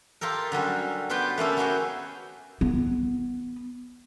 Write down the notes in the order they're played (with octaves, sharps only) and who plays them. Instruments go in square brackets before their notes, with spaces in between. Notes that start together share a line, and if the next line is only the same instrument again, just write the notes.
[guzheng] F4 G4 A4 A#4
D3 F#3 G3 C#4
B3 F4 G4 B4 G5
A3 A#3 C#4 A4
B3 D#4 E4 F#4 G#4 G5
[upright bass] B3